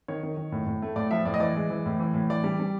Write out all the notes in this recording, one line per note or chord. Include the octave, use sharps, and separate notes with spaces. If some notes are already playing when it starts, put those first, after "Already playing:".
D#3 C#5
D#3
D#3
A2
A2
A3
A2 D5
F3 E5
A2 D5
D#5
E3 D5
G#3
E3
A2
E3
A2
E3 D5
G3
G3